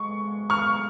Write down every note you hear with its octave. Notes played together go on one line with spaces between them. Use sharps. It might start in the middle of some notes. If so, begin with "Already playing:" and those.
Already playing: G#3 C#6
C#6 F6